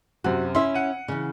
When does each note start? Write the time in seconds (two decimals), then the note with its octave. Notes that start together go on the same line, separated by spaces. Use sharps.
0.24 F#2 C3 F#4
0.55 C#4 E4 E5 C6
0.74 F#5 D#7
1.08 C#3 E3